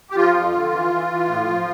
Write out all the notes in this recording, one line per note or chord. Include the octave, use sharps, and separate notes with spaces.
G4
F3 F4
F2
D3
E3
E3
E3
A2
F3